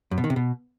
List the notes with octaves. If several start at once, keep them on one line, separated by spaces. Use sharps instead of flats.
F#2
B2
D#3
C3
B2